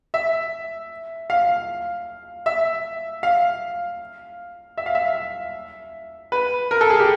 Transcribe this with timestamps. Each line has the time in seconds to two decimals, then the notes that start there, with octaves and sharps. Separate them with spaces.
0.14 E5
1.30 F5
2.46 E5
3.23 F5
4.77 E5
4.86 F5
4.95 E5
6.32 B4
6.71 A#4
6.81 A4
6.90 G#4
7.00 G4